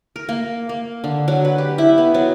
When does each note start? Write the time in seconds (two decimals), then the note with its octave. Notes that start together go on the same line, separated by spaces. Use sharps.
0.16 A#4
0.29 A#3
0.69 A#3
1.04 D3
1.28 F#3
1.45 B4
1.58 G4
1.78 E4
1.98 B3
2.14 F#3